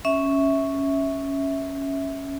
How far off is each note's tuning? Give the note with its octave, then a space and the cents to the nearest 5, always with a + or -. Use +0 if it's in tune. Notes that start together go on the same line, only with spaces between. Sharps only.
C#4 +0 E5 -10